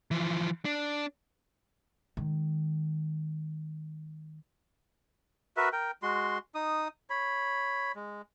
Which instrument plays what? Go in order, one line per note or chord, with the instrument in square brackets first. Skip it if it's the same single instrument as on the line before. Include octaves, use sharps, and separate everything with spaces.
[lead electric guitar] E3 F3
D4
[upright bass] D#3 G#3
[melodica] F#4 A#4 B4 E5
A#4 G5
G#3 F#4 C6
D#4 D#6
C#5 B5
G#3